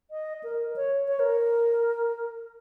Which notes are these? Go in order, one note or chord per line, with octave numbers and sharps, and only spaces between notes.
D#5
A#4
C#5
C#5
A#4